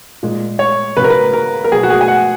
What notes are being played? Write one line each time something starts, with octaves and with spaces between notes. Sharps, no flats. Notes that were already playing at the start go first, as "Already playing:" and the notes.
A#2 G#3
C#5
C#3 F#3 B4
A#4
B4
A#4
A#4
B2 F#3 G#4
F#4
G#4
G#5
F#5